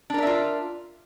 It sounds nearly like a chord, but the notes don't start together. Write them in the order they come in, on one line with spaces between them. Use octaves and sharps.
D4 A#4 D5 E5 F4